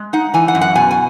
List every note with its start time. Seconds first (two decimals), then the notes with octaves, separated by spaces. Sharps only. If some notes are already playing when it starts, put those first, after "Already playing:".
Already playing: G#3
0.13 D#4 F#5
0.34 E3 G#5
0.48 F#5
0.55 F#2
0.61 F#5
0.75 B2 G#5
0.91 G#5